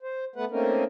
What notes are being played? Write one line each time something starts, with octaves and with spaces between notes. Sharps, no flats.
C5
A3 B3 B4 F#5
A3 A#3 C4 C#4 D#4 A#4